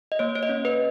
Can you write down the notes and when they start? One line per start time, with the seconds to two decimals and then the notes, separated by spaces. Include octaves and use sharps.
0.12 D#5
0.19 A#3 C#5
0.35 C#5
0.43 D#5
0.49 C#4
0.65 B4